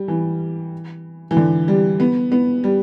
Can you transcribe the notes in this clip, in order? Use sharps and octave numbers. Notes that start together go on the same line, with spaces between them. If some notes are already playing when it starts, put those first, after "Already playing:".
Already playing: G3
E3
E3
D3
G3
B3
B3
G3